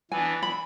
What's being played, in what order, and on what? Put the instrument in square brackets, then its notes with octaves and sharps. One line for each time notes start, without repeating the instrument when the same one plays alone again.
[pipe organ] E3 B3 D4 [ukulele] G#5
[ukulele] B5